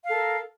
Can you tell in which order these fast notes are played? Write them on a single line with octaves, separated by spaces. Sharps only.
F5 A4 A#4